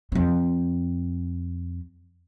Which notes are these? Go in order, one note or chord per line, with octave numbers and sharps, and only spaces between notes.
F2 C4